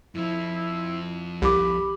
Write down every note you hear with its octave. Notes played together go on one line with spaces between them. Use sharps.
F2 F3 E4
C2 G4 B5 D6